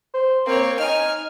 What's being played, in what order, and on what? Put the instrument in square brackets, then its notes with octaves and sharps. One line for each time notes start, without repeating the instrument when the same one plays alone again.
[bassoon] C5
[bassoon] A#3 [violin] C4 C#5
[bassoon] D#4 [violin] G#5 F6